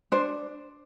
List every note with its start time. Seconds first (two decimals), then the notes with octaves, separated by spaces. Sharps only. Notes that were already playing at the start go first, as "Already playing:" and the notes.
0.12 D4 C5